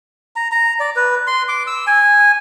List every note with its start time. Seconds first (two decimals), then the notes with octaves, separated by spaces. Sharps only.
0.36 A#5
0.51 A#5
0.80 D5
0.96 B4
1.27 C6
1.48 D6
1.67 E6
1.87 G#5